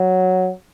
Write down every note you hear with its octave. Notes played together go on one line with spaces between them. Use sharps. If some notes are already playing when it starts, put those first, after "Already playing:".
Already playing: F#3